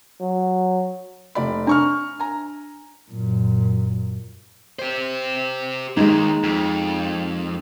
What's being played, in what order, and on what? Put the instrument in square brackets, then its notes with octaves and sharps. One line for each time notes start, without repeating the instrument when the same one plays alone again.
[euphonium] F#3
[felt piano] F1 D5 B5
[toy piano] D4 [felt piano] A#5 C#6 F6
[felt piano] G#5 A#5
[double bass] F#2 A#2
[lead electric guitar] G4 C5
[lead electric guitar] D#2 [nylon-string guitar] G#3 D#4
[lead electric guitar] F2